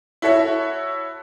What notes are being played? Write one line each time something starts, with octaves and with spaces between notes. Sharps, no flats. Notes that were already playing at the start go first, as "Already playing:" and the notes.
E4 F#4 A4 C#5 E5